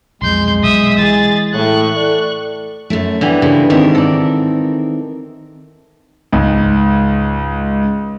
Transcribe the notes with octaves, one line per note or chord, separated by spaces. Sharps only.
B1 F2 G#3 C6 G6
B1 E5 D#6
E3 G#4 A6
A2 C#6 F#6
A4 D5
F#2 A3
D3 E3 G3 B3
G2 C#3 A#4
G#2 D#3 C4 A#4
A4 D5
C#2 G#2